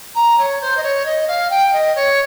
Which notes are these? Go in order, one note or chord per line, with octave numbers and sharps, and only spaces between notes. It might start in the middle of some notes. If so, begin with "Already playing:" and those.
A#5
C#5
C5
D#5
C#5
D#5
F5
G5
D#5
C#5